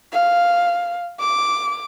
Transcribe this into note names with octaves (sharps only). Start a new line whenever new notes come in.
F5
D6